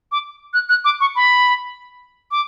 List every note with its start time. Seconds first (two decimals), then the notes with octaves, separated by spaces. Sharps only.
0.12 D6
0.53 F#6
0.69 F#6
0.85 D6
1.00 C#6
1.16 B5
2.31 D6